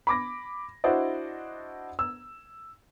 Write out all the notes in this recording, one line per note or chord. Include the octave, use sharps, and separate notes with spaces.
B5 D6 A#6
D4 E4 F#4 C5 D5 D#5
E6